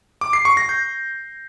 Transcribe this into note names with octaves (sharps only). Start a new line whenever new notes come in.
D6
C7
C#6
A#6
G6